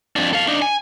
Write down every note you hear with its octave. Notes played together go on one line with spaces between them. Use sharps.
F2 D4
A4 F5
D4 D#4
G#5